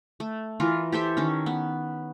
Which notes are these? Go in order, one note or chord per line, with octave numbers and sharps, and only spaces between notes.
A3
E3 F4 A#4
G4 A4 C5 E5
D#3 C#4
B3